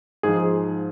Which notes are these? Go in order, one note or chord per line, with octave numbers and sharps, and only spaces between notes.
G#2 F3 G#4